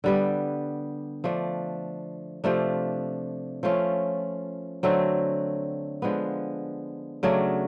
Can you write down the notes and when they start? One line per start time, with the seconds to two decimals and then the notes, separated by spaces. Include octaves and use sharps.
0.04 D3 G3 B3
1.24 F3 A3 D4
2.44 C3 F3 A3 D4
3.63 F3 A3 C#4 F4
4.83 D3 F#3 A3 C4
6.02 D3 F3 G#3 B3
7.23 C#3 F#3 A3 D4